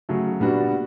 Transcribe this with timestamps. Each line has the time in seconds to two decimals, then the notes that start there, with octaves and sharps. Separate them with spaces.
0.09 C#3 F#3 A3
0.40 A#2 G3 B3 D4 F#4